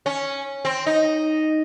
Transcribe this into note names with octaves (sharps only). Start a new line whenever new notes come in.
C#4
C4
D#4